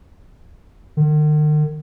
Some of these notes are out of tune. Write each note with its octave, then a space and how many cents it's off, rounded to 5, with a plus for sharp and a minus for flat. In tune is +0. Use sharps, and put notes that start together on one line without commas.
D#3 -45